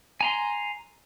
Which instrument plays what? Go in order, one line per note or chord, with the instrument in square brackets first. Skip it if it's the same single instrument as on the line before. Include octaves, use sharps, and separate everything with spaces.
[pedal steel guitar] G#5 A#5 C6